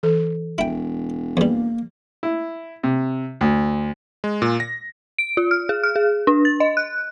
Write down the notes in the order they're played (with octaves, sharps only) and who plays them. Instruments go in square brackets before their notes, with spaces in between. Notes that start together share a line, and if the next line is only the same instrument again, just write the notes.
[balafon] E3 A4
[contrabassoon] E1 [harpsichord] E4 G5
[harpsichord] E2 G3 [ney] A#3
[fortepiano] E4
C3
D2
[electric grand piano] G#3
A#2
A#6
[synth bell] D7
F4
F6
G#4
F6
G#4
D4
A6
D#5
F#6